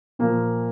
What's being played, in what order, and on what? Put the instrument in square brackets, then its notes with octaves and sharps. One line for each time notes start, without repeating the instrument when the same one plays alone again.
[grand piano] A#2 F3 A#3